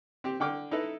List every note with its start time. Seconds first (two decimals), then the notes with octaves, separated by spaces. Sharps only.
0.24 C4 G4
0.40 D3 G5 D6 F6
0.71 D#4 E4 A4 B4 D#5